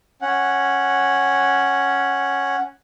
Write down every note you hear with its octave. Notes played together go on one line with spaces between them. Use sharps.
C#4 F#5